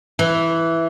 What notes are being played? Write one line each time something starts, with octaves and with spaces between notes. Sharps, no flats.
E3